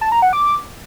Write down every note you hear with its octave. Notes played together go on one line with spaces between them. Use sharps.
A5
A#5
F#5
D6